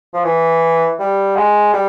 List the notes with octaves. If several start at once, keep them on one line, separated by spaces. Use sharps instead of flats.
F3
E3
G3
G#3
G3